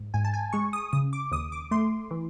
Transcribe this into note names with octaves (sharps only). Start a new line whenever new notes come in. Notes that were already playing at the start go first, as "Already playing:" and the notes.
Already playing: G#2
G#2 G#5
A5
G#5
G#3 C#6
D#6
C#3 D#6
D6
D#2 D#6
D6
A3 C6
E3